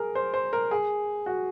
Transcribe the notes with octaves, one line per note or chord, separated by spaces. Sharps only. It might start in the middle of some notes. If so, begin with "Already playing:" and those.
Already playing: G#4 A#4
C5
C5
A#4
G#4
F#4